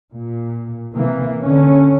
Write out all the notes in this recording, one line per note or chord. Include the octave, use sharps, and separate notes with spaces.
A#2
C3 E3 A#3
D3 C#4